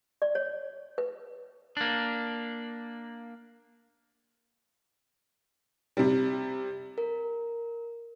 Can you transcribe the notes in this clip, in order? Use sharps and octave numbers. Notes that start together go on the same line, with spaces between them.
D5
C#5
B4
A#3 D4
C3 G3
A#4